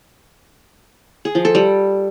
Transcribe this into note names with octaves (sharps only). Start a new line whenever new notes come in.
G#4
F3
A4
G3